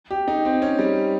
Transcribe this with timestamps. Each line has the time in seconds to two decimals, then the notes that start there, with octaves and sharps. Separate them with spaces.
0.11 G4
0.28 D#4
0.45 C4
0.62 C#4
0.79 G3